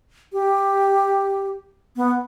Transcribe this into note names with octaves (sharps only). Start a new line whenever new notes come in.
G4
B3